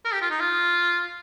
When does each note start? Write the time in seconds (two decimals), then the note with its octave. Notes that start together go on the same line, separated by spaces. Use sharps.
0.05 A#4
0.13 G4
0.22 F4
0.31 D#4
0.40 F4